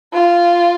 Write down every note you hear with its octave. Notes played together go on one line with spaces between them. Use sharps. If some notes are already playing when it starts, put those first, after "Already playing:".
F4